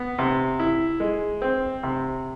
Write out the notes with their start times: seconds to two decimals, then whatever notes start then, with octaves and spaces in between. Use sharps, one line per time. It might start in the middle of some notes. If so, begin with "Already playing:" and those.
Already playing: B3
0.19 C3
0.59 E4
1.00 G#3
1.42 C4
1.83 C3